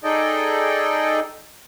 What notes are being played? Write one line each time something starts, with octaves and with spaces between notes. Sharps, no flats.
D#4 G#4 A4 D5 D#5 G5